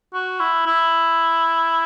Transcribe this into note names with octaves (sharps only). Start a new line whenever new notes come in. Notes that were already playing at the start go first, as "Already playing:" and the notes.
F#4
E4
E4